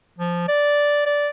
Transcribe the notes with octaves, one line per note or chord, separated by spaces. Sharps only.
F3
D5
D5